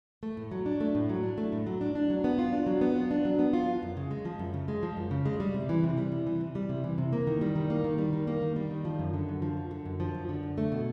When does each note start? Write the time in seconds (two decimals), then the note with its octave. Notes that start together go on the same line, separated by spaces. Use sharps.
0.23 A3
0.37 A2
0.51 F#3
0.66 D4
0.80 A3
0.95 A2
1.09 F#3
1.23 D4
1.38 A3
1.52 A2
1.67 F#3
1.81 D4
1.95 D4
2.10 F#3
2.24 B3
2.39 F4
2.53 D4
2.67 F#3
2.81 B3
2.96 F4
3.11 D4
3.25 F#3
3.39 B3
3.53 F4
3.68 F3
3.83 F#2
3.97 C#3
4.11 G#3
4.25 F3
4.39 F#2
4.54 C#3
4.68 G#3
4.83 F3
4.97 F#2
5.11 C#3
5.26 G#3
5.40 G3
5.54 C3
5.69 E3
5.84 C3
5.98 G3
6.12 C3
6.27 E3
6.41 C3
6.55 G3
6.69 C3
6.84 E3
6.98 C3
7.13 A#3
7.27 D#3
7.41 G3
7.55 D#3
7.70 A#3
7.84 D#3
7.98 G3
8.13 D#3
8.27 A#3
8.42 D#3
8.56 G3
8.71 D#3
8.85 F3
8.99 F#2
9.14 D3
9.29 F#2
9.42 F3
9.57 F#2
9.71 D3
9.86 F#2
10.00 F3
10.15 F#2
10.29 D3
10.43 F#2
10.58 A3
10.72 B2